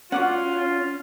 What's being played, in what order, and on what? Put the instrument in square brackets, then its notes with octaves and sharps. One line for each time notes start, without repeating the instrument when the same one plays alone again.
[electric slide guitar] C#4 [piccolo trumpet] F4 [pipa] F#4 D5 F#5